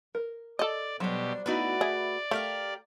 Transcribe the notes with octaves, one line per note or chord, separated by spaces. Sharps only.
A#4
A4 D5 D#5
B2 F#3 G3 D4 G4 C5
A3 B3 D#4 E4 F#4 B4 D5
G#4 E5
A3 G4 A#4 F5